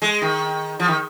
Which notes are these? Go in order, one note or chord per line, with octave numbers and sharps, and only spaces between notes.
G#3
D#3
F3
D#3